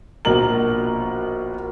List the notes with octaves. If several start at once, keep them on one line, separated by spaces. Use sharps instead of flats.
A#1 B2 A#4 F#7